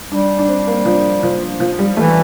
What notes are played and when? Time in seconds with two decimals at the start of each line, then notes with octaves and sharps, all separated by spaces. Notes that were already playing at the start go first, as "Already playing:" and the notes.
0.11 G3 D4
0.39 D4
0.48 C4
0.67 A#3
0.86 F3
1.23 F3
1.60 F3
1.79 G3
1.97 E3 A3